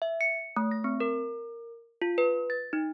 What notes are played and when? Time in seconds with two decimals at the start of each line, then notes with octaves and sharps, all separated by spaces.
0.02 E5
0.21 C#7
0.57 A3
0.71 A#6
0.84 C4
1.00 A#4
2.02 F4
2.18 B4
2.50 A6
2.73 D#4